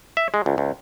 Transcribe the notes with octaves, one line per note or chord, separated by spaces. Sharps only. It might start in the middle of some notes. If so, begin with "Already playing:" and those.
E5
G#3
C#2
C#2